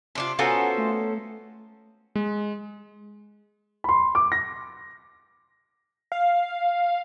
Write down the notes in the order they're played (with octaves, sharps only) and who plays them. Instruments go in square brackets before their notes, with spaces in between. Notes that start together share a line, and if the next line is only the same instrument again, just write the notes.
[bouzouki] C3 D4 F4 [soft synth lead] C6
[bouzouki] B3 C#4 A4 [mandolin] F4 F#4 C5 [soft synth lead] A#5
[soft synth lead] A3
[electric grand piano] G#3
[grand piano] B5 C6
D6
A#6
[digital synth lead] F5